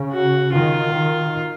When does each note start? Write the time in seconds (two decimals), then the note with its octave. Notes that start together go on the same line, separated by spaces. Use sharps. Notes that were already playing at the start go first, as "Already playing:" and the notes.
Already playing: C#3
0.13 F#4
0.53 D#3 F4
0.95 D#3